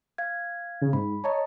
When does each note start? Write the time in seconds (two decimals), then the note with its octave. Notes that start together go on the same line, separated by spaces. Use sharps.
0.18 F5 G#6
0.81 C#3
0.93 G#2 B5
1.24 C#5 D#5 A5 A#5